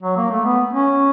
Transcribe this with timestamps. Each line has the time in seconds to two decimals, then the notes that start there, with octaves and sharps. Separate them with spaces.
0.03 F#3
0.17 A#3
0.31 A3
0.45 B3
0.73 C#4